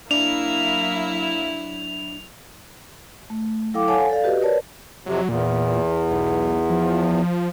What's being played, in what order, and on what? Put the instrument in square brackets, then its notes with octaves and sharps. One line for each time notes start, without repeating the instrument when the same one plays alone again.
[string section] F#3 E4 [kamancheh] A#3 E5 [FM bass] D4 [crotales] F7
[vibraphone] A3
F#3 E4 A4 F5 G5 D6
A4 C#5 F5 F#5 G#5 A5
A4 D5 F5
F#4 G4 B4 D#5
A#4 B4 C#5 D5 A5
[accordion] F2 C3 [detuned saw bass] F#3
[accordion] E2 [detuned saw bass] A#2
[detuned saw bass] B1
F3